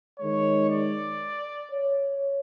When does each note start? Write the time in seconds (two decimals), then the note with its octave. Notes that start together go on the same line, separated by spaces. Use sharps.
0.19 D#3 G#3 C#5
0.70 D5
1.72 C#5